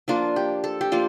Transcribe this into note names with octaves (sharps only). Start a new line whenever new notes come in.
F3 A#3 D4 F4
G4
A4
G4
F3 A#3 D4 F4